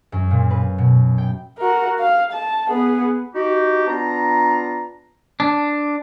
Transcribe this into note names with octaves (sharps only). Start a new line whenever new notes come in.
F#2
A#2
B4
B2
G5
F#4 A#4
F5
A5
B3 G#4
D#4 F#4 G4
B3 D4 F4 A5 A#5
D4